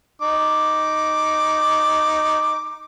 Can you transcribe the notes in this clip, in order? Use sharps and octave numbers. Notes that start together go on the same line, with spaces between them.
D#4 D6